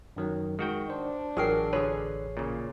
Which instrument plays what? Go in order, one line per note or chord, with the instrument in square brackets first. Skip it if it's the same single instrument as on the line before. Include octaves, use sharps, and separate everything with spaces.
[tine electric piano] F#2 D#3 F#3
[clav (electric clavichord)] D#3 F#4 G5 [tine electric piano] G#3
[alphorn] D4 [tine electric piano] C5
[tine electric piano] A1 C#6 C7 [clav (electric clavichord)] F#3 [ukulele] G#4 A#4 G5
[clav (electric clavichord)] D3 B4 [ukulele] G#4 C#5
[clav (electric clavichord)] A#2 C#3